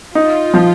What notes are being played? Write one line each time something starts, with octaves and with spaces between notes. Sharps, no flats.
D#4 F4
F3